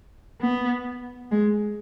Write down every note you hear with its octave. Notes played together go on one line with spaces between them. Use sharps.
B3
G#3